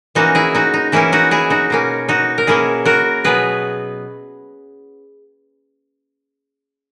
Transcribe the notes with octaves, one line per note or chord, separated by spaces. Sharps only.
E3 A#3 C#4 D#4 F#4
E4 G#4
D#4 F#4
D#4
E3 A#3 C#4 E4
D#4 F#4
E4 G#4
D#4 F#4
B2 A#3 C#4
D#4 F#4
A#4
B2 A#3 C#4 E4 G#4
F#4 A#4
B2 F#3 B3 G#4 B4